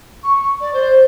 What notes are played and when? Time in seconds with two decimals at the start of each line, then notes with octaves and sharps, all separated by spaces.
0.23 C#6
0.60 D5
0.73 C5